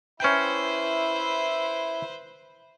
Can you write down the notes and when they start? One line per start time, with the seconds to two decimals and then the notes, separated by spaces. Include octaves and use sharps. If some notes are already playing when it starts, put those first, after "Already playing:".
0.20 C#4 E4 B4 C5 G5